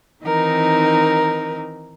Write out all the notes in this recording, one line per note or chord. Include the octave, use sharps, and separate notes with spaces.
D#3 E3 C4 D#4 A#4